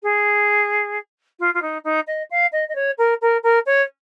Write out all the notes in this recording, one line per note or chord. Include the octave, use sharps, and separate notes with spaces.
G#4
F4
F4
D#4
D#4
D#5
F5
D#5
D#5
C#5
A#4
A#4
A#4
C#5